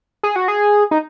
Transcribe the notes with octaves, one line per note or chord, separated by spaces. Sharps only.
G#4
F#4
G#4
D#4